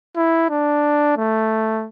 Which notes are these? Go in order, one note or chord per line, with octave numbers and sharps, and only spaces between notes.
E4
D4
A3